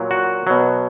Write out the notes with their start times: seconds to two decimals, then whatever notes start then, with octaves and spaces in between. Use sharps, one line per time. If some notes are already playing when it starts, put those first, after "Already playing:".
Already playing: A#2 F#3
0.11 F#4
0.47 B2 F#3